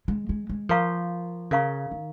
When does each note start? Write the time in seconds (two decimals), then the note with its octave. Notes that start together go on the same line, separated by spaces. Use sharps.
0.08 G#3
0.29 G#3
0.49 G#3
0.69 F3 A#4 F5 A#5 C#6
1.51 C#3 A#4 F5 A#5 C#6
1.91 D#3